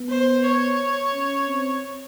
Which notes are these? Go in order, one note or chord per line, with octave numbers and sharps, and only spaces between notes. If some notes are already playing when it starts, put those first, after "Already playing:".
Already playing: B3
C5
C#5
C#4
C4